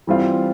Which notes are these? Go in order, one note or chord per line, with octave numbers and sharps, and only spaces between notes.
E3 G3 C4 F4